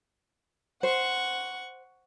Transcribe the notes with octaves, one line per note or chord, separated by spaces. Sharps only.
C5 F#5 C#6